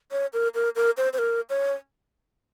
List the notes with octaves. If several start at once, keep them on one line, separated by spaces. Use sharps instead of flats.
C#5
A#4
A#4
A#4
C5
C5
A#4
C#5